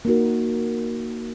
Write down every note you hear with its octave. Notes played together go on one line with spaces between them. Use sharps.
A#3 D#4 F#4 A#4